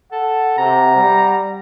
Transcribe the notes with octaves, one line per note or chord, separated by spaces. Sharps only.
A4 F#5
C3 A#5
G3